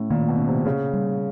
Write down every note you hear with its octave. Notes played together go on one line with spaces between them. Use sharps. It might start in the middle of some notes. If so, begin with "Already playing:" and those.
Already playing: A2 C#4
A#2 D#3
B2
C#4
C3
C#3 A#3
G3